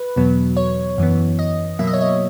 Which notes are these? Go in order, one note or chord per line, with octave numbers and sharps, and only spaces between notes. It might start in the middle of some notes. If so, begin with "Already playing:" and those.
Already playing: B4
E2 B2 F#3 B3
C#5
F#2 E3 B3
D#5
B2 F#3 A#3 E5
D#5
C#5
D#5